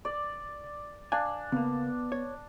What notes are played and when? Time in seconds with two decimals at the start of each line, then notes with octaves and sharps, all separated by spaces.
0.05 D5
1.12 D4 F5 G#5
1.52 C#3 A#3 B3
2.12 C#5